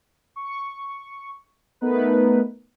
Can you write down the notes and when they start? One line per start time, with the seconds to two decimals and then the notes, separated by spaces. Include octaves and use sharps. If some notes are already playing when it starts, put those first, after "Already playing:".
0.36 C#6
1.81 A3 B3 D#4 A#4 B4